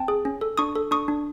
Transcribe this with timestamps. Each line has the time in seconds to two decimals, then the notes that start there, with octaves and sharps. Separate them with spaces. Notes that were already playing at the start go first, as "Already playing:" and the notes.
Already playing: C4 G5 A5
0.08 G#4
0.25 C#4
0.41 A4
0.57 D4 C#6 D#6
0.75 A4
0.91 D4 C#6 D#6
1.08 D4